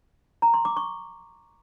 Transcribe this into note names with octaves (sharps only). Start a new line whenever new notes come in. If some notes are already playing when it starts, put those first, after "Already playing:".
A#5
C6
D6
C#6